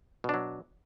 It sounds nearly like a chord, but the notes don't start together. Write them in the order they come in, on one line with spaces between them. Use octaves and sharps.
B2 D4 F#3